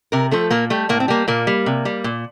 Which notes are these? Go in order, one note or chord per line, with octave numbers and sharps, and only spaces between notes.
C3 A#4
F3 A3 A4
A#2 A#3
G3 A3
A2 A#3
C4
G3 A#3
A#2 A#3
G3
C3
G3
A#2